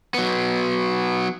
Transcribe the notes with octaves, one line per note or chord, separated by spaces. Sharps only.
F#3 B3